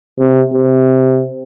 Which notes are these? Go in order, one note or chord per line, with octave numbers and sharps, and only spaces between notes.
C3
C3